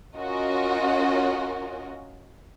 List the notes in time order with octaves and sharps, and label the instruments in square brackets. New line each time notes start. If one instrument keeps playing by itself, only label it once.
[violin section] C#4 F4 F#4 A#4 D#5